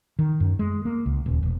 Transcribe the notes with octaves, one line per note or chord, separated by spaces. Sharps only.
D#3
F#2
G#3
A#3
C#2
D#1
E1